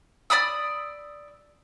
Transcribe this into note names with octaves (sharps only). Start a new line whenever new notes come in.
D5 B5 D#6 E6